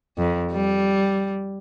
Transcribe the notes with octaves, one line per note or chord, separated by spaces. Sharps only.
F2
G3